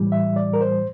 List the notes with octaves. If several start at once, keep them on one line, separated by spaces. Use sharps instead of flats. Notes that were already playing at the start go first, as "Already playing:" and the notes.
Already playing: A2 E3 G3
E5
D5
A#4
C5